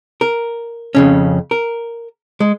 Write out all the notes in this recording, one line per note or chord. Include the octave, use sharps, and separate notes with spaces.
A#4
F2 C#3 C#4
A#4
G#3